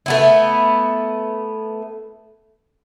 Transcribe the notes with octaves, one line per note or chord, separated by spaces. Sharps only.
A3 B3 E4